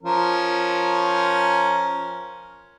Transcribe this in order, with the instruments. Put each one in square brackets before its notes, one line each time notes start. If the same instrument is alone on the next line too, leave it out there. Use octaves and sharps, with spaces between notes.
[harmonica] F3 C#4 A#4